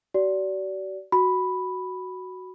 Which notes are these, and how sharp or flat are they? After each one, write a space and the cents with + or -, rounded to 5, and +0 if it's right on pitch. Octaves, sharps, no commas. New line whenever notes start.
F#4 +45 D5 -20
F#4 +0 B5 +0